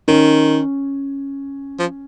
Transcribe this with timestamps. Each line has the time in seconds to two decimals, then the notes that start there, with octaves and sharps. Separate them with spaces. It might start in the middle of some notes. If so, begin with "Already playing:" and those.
0.08 D#3 C#4
1.79 F3